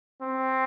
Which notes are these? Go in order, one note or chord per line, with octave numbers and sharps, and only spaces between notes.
C4